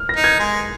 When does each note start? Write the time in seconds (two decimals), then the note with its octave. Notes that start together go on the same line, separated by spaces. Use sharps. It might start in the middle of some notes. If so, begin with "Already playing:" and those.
Already playing: F6
0.09 A#6
0.16 D#4
0.24 G#6
0.39 G#3